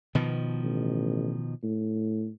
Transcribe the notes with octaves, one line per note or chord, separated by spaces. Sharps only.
B2 D#3 F3
A1
A2